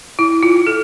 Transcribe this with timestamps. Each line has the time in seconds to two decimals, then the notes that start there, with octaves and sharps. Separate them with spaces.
0.19 E4
0.43 F4
0.67 A4